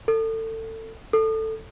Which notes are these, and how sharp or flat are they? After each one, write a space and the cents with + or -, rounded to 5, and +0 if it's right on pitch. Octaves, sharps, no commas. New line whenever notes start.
A4 +25
A4 +10